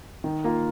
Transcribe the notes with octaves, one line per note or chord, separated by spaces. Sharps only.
D#3
A#3 F4